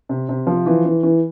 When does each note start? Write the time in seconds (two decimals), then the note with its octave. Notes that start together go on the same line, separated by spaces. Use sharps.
0.09 C3
0.29 C3
0.47 F3
0.66 E3
0.85 E3
1.03 E3